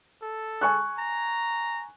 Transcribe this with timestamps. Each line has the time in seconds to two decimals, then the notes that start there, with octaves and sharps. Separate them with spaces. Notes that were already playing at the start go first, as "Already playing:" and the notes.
0.22 A4
0.61 G#5 C#6 F#6
0.98 A#5